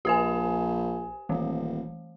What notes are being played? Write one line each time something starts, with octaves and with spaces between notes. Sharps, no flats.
A#1 G4 C5 G#5
D#1 E3 A3